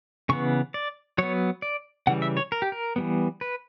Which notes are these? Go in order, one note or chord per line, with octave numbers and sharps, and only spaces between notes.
C#3 E3 B3 C#6
D5
F#3 B3 C#5
D5
C#3 E3 G3 F#5
E5
C#5
A#4
G4
A#4
E3 G3 B3
B4